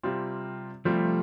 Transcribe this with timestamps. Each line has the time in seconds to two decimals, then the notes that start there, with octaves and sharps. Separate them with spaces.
0.03 C3 G3 C4 F4
0.85 C3 F3 G3 A3 C4 F4